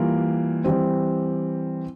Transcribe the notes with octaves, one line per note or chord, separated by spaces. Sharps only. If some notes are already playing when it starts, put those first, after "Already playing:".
Already playing: E3 G3 A#3 F4
E3 G3 C4